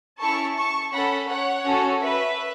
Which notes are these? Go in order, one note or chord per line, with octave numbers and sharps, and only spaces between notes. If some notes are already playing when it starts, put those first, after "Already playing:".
C#4 E4 A4 A5 C#6
A5 C#6
C#4 A4 F#5 B5
C#5 F#5
C#4 F#4 A4
B4 E5